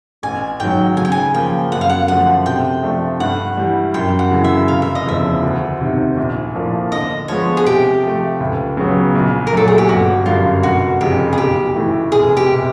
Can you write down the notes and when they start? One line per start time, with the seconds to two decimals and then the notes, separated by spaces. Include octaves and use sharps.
0.23 A1 G#5
0.60 G#2 D#3 F#3 G5
0.97 C#3 G#5
1.05 G5
1.12 G#5
1.34 F3 A#3 G5
1.71 F#2 F#5
1.81 F5
1.90 F#5
2.08 D3 F3 A3 F#5
2.46 C3 G5
2.83 F3 A3 D4
3.20 G2 F#5
3.57 E3 G3
3.94 F#2 G5
4.19 F#5
4.31 C#3 E3
4.44 E5
4.68 F1 F5
4.82 E5
4.95 D#5
5.06 E2 C#3 F3 E5
5.42 D2
5.81 C3 D#3
6.17 A#1
6.54 A2 F3 A#3 D4
6.92 D3 D#5
7.28 F3 G#3 B3 C#5
7.57 G#4
7.66 C3 G4
8.03 F3 A3
8.40 C#2
8.77 C#3 F#3 B3
9.15 A#1
9.47 A#4
9.53 A#2 F#3 A3 D4 A4
9.68 G#4
9.78 G4
9.89 G1 F#4
10.26 F#2 D3 G3 F4
10.63 F1 F#4
11.00 F2 C#3 G4
11.33 G#4
11.38 B1 G4
11.75 A2 E3 A3
12.12 F1 G#4
12.37 G4
12.52 C3